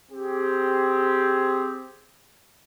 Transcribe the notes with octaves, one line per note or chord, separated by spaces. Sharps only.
C4 G4 G#4